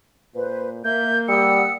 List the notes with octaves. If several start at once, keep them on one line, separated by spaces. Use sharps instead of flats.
A#2 B4 C5
A#3 A#4 E5 G6
G3 F#5 D#6 E6 C#7